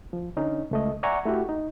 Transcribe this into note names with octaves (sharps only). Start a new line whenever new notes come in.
F3
D3 C#4 D#4
C#2 A3 D#5
D5 E5 F#5 G#5 A#5 C#6
A3 E4 F#4 G4
D#4